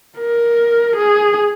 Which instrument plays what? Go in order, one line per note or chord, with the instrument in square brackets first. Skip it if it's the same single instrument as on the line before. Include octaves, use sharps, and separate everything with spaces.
[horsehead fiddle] A#4
G#4